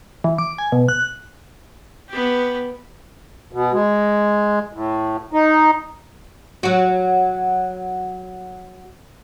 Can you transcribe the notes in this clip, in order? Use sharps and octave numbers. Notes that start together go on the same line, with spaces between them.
E3
D6
G#5
B2
F#6
B3 G4
B2
G#3
A2
D#4
F#3 F#4